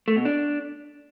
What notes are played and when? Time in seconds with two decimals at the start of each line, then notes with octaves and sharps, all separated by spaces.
0.08 A3
0.16 B2
0.25 D4